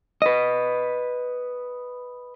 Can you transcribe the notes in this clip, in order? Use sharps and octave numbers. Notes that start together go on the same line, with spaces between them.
B4 D#5